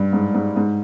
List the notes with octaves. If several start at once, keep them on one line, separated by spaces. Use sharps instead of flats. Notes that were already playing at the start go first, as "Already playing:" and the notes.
Already playing: G2
G#2
G#2
G#2